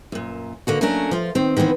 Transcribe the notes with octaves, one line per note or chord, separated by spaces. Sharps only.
F#2 A#2
D3 A#3 F#4
F#3 A3 A#3 C#4 D4 A#4
F3 F4
D#3 C4
D#3 E3 G3 B3 C4